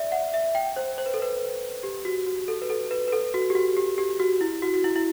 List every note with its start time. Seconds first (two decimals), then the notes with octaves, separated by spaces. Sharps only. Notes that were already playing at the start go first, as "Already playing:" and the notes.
Already playing: D5 E5
0.12 F#5
0.34 E5
0.55 G5
0.76 C5
0.98 C5
1.06 B4
1.14 A4
1.22 B4
1.83 G4
2.05 F#4
2.26 F#4
2.48 A4
2.62 B4
2.70 A4
2.91 B4
3.08 B4
3.12 A4
3.34 F#4
3.50 G4
3.55 F#4
3.77 G4
3.98 G4
4.20 F#4
4.41 E4
4.62 F#4
4.74 F#4
4.84 E4
4.96 E4